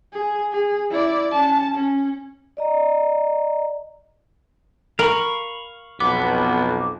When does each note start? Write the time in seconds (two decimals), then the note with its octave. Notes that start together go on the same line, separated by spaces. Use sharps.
0.13 G#4
0.53 G#4
0.91 E4 D5
1.31 C#4 A5
1.74 C#4
2.57 D5 D#5 A#5
4.99 A#4 F5 B5 C#6
6.00 B1 F2 B3 D6